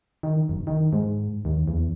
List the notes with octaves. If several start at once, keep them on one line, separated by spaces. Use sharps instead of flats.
D#3
F#1
D#3
G#2
D#2
E2